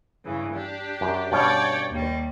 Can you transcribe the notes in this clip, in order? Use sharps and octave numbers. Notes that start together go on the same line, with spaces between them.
G2 C#3 E3
D4 G4
F#2
G2 B2 C#4 C#5 D5 G5
D#2 G3